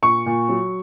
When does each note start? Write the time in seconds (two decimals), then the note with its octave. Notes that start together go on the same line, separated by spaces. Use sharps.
0.02 A#2 C#6
0.26 A#2
0.49 F#3